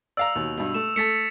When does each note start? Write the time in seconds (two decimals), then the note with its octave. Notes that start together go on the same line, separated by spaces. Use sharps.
0.17 D5 F5 A#5 E6 F7
0.35 D#2 B2
0.57 G2 B2
0.74 A3 E7
0.96 A3 A4 A6 B6 C#7